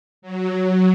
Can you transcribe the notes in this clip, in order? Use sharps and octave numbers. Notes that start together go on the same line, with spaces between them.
F#3